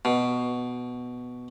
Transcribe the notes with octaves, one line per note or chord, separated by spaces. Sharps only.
B2